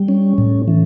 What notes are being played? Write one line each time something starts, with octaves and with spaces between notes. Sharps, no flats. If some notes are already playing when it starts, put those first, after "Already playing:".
Already playing: G3
C#4
A2
E3